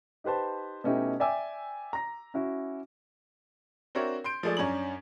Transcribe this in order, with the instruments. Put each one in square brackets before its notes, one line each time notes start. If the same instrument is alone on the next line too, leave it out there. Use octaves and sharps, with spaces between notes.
[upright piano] D#4 G4 B4 C5 A5
B2 A3 C#4 D#4 E4 G4
D5 E5 G5 G#5 D6 E6
A#5 A#6
C#4 E4 F#4
[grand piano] C4 D4 F#4 A#4 C#5 E5
C6 G6 D7
F3 G#3 A3 G#4 D5
F#2 C#4 D4 A#5 F#7